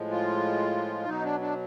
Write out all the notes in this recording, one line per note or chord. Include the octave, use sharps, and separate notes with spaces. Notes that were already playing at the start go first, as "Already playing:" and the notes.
Already playing: A2 F3 G#3
F4
B2 F#3 D#4
D4
D4